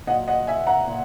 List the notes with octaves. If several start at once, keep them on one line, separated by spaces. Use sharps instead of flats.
A#2 F#3 D#5 F#5
D#5 F#5
E5 G#5
F#5 A#5
A#2